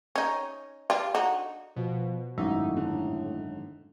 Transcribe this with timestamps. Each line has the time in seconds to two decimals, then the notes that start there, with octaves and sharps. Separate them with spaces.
0.16 C#4 D#4
0.90 G3 F4
1.15 D3 D#4 F#4
1.77 B2 F3
2.38 G#1 F#2 A2 D#4 E5
2.77 D3